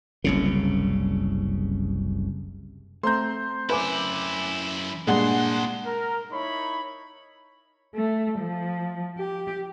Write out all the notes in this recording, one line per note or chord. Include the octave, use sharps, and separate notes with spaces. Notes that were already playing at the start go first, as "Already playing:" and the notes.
F#1 C2 C#3
A3 C4 C5 A#5 C6 G6
F#2 E4 B4 G#5 D6
C2 G2 A#2 G#3 D4 F#5 C6
A#4
D#4 E4 C#5 B5
A3
F3
G4